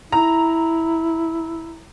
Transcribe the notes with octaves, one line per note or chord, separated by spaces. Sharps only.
E4 A#5